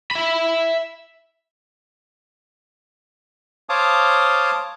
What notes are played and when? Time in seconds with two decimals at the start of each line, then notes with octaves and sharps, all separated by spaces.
0.11 E5 B5
3.69 C5 C#5 F5 A5 D6 D#6